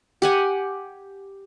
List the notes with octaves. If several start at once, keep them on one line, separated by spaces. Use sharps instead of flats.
G4 F#5 G#5